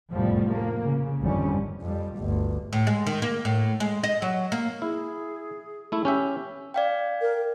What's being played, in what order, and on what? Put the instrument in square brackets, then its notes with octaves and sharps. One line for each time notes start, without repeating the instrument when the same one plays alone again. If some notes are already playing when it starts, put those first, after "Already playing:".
[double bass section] F1 E2 A2 F3 G3
A#3
C#3
G#1 F2 D3 G3 C#4
[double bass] F2 G3
G1 D2
[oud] A2
G#3
D#3
A#3
A2
G#3
D#5
F#3
A#3
[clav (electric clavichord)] E4 [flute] G#4
[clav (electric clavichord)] A3 E4
C#4 G4 E5
[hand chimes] D5 F5 G5
[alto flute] A#4